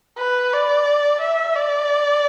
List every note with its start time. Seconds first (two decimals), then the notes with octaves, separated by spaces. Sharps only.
0.18 B4
0.53 D5
1.21 E5
1.55 D5